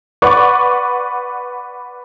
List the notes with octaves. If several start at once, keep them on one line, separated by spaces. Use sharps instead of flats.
B4 D5 F#5 C#6 D6